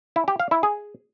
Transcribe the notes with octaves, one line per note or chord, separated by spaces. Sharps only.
E4
G4
F5
E4
G#4